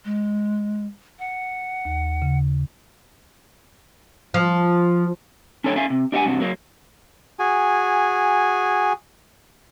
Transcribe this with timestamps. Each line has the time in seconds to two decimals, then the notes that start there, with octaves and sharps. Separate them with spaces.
0.05 G#3
1.19 F#5
1.85 D#2
2.22 C#3
4.34 F3
5.64 C#4 D4 A4 C#5 F#5 G5
5.76 C#4 E5 F5 G#5
5.90 C3
6.12 D4 G4 D#5 E5 F#5 G#5
6.25 G2 C3 F#4
6.40 F#3 A#3
7.39 F#4 G#4 G#5